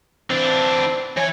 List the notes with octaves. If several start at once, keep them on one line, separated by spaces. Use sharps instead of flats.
E3 C4 D4
E3 C#5 G#5